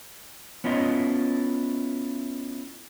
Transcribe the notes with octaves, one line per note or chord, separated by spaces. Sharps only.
B3 C#4 E4 F4 A#4 D#5